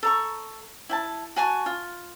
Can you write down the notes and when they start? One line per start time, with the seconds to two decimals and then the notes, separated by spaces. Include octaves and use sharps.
0.03 A4 A#5 C#6
0.89 E4 G5 A5
1.36 F#4 G#5 A5 C#6
1.66 F4